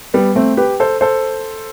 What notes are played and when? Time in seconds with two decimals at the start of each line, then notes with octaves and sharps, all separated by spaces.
0.14 G3 B3
0.36 A3 C4
0.57 G4 B4
0.80 A4 C5
1.01 A4 C5